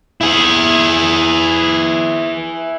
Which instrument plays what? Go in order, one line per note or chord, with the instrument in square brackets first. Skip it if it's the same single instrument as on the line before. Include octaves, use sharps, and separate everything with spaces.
[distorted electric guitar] E4 G#4